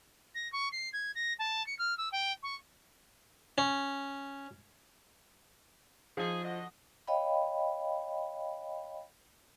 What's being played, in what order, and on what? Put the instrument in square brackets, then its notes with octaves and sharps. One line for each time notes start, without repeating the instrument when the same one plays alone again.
[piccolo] A#6
C#6
C7
G#6
A#6
A5
C#7
F6
E6
G5
C#6
[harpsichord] C#4
[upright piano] F3 [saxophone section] D#4 G#4
[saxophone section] D3 F#4 D#5
[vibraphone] C#5 D#5 F5 G5 B5